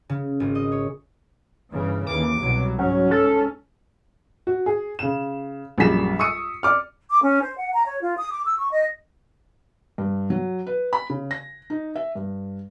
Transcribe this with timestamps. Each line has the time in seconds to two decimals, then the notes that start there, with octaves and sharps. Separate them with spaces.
0.09 C#3
0.40 G#1
0.55 D#5
0.72 C#5
1.73 G1 C#3 E3
2.07 D#2 E3 D6
2.40 C2 B2 F#3
2.78 G#2 F#3 C#4
3.11 A4
4.47 F#4
4.66 G#4
4.99 C#3 E7
5.78 A#1 F#2 G3 G#4 B6 E7
6.19 C#6 D#6 E6 C#7 D#7
6.63 D5 D6 F6
7.10 D6
7.23 C#4
7.43 C5
7.59 F#5
7.73 A#5
7.86 C#5
8.01 F4
8.17 D#6
8.32 D6
8.45 E6
8.57 C#6
8.72 D#5
9.98 G2
10.30 F#3
10.67 B4
10.93 B5
11.10 C#3
11.31 A#6
11.70 D#4
11.96 E5
12.15 G2